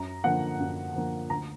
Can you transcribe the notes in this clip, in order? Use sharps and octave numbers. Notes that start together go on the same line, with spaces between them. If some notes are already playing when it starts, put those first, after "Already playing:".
Already playing: F#2 A#5
D3 F3 A#3 F#5
F#2
D3 F3 A#3
D2 A#5